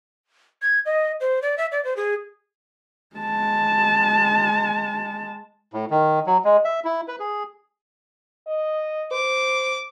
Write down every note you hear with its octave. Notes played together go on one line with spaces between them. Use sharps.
G#6
D#5
C5
D5
E5
D5
C5
G#4
G#3 A5
A2
D#3
F#3
G#3
E5
E4
B4
G#4
D#5
C5 D6